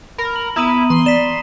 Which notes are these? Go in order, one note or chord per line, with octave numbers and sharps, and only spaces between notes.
A#4 B5
F#7
B3 E4 A#5 D#6 D#7
E3 C6
D5 B6 E7